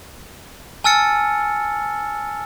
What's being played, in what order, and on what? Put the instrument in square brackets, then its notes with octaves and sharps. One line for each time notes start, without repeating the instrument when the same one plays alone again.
[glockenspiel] G#5 A5 E6 F6 A6 C#7